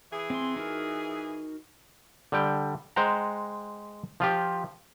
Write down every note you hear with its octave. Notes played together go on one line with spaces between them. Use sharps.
E3 G#4
C4 C6
D#4 F#4 A#4
D3 G3 G5
G#3 C5 F#5 G5 A#5
F3 F4 G4